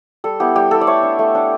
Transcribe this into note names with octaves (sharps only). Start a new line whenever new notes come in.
G3 A4
B3 E4 G4
G3 G4
B3 E4 A4
D5
A3 C#5
D4
A3
D4